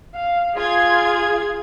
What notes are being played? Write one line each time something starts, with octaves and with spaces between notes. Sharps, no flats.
F5
F4 G#4 G#6